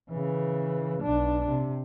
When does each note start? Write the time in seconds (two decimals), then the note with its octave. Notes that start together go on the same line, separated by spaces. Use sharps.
0.10 C#3 E3
1.02 B1 D4
1.48 C3